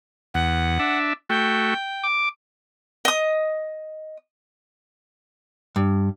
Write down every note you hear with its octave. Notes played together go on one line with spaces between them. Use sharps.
E2 F#5
D4 E5
A3 F#4 G5
D6
D#5 D#6
G2